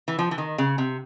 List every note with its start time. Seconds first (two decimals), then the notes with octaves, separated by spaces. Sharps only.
0.08 E3
0.19 F3
0.31 E3
0.38 D#3
0.58 C#3
0.78 C3